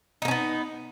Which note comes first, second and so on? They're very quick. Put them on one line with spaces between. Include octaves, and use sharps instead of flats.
D#4 A#3 C#4 B3